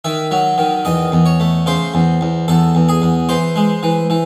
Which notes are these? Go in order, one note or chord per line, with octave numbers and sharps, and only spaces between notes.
D#3 E5
F#3
D#3
E2 D#5
E2
C#5
A3
C#3 C5
E2
E2
E2 A4
E2
G#4
E2
E3 C5
G#3
E3
E3